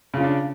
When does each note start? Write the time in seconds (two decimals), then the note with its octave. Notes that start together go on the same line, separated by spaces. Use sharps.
0.14 C#3
0.17 F4
0.20 C#4
0.24 D4